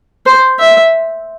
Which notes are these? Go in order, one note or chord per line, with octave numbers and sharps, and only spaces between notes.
C5
E5